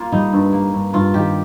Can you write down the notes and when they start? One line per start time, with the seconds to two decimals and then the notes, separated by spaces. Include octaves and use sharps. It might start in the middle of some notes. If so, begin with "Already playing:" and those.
Already playing: A#3 F4
0.12 G3 D#4
0.33 G2
0.53 A#3
0.73 G2
0.93 G2 F4
1.14 D#3 G4